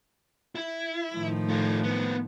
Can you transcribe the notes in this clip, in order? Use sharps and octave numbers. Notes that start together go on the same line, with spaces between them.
E4
A2 D#3 F3
A3 F4
B3 C4